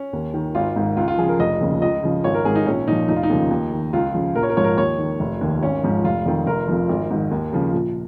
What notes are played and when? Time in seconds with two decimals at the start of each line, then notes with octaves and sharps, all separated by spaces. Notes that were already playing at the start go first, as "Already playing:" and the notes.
Already playing: C#4
0.13 D#2
0.34 D#3
0.55 G#1 F4
0.76 G#2 D#3
0.97 C#2 F4
1.08 F4
1.18 C#3 F3 G#4
1.29 A#4
1.39 F1 D#5
1.61 D#2 C#3 F3
1.82 C#2 D#5
2.03 C#3 F3
2.24 G#1 C#5
2.34 A#4
2.45 G#2 D#3 G#4
2.55 D#4
2.66 A#1 C#4
2.88 A#2 F3 D#4
3.09 F1 D#4
3.16 F4
3.23 D#4
3.30 D#2 C#3 F3
3.51 D#2
3.72 D#3
3.93 C#2 F4
4.14 C#3 F3
4.35 A#1 A#4
4.43 C#5
4.50 A#4
4.57 G#2 F3 C#5
4.64 A#4
4.77 D#2 C#5
4.99 D#3
5.20 F1
5.41 D#2 D#3
5.63 G#1 C#4
5.83 G#2 F3
6.04 F1 F4
6.26 F2 D#3
6.47 F1 A#4
6.68 F2 F3
6.89 G#1
7.10 G#2 D#3
7.31 D#2
7.52 C#3 F3
7.73 A#1